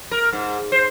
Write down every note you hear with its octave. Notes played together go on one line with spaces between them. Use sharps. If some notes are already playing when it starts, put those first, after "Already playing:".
A#4
G#2
C5